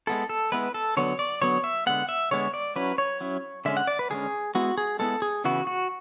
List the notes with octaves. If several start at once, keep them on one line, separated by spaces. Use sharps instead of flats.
G#3 B3 E4 A4
A4
G#3 B3 E4 B4
A4
D3 F#3 B3 C#5
D5
D3 F#3 B3 C#5
E5
D3 G#3 B3 F#5
E5
D3 G#3 B3 C#5
D5
F#3 C#4 E4 B4
C#5
F#3 C#4 E4
D3 G#3 C#4 E5
F#5
D5
B4
D3 G#3 C#4 G#4
G#3 B3 E4 F#4
G#4
G#3 B3 E4 A4
G#4
C#3 E3 B3 E4 F#4
F#4